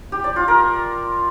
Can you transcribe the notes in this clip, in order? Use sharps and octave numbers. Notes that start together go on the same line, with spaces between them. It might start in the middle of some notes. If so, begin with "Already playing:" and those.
G4
D5
F4
A#4